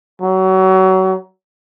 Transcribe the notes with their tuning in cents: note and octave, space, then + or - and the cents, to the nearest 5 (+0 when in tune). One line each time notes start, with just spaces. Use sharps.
F#3 +30